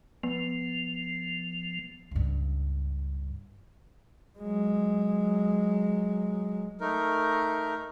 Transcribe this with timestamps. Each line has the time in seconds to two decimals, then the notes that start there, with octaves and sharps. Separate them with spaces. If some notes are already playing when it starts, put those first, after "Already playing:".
0.24 F3 B3
2.11 C#2 G2
4.39 F#3 G#3
6.80 A3 D#4 A#4